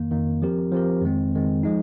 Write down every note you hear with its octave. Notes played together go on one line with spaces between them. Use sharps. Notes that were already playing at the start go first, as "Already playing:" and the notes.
Already playing: F2 D#3 A#3
F2 D#3 A#3
F3 C4 G4 A#4
F3 C4 G4 A#4
F2 D#3 G#3 C4
F2 D#3 G#3 C4
F3 G#3 D#4